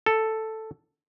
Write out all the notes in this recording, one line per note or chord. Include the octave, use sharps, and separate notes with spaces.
A4